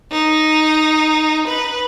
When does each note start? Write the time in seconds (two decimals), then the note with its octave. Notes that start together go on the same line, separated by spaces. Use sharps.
0.12 D#4
1.48 B4